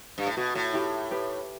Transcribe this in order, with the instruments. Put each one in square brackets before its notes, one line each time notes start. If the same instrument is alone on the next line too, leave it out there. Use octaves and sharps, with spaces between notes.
[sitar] G2
A2
[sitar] B2 [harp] F#4
[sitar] A2
[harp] E4 G4
G4 B4